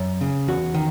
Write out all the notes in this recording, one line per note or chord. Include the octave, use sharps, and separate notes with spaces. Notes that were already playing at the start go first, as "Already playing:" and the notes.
Already playing: F#2
C#3
E2 F#4
D#3